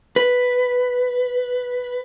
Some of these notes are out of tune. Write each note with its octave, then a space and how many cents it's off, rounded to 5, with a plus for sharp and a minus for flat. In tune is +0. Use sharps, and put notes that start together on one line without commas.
B4 +5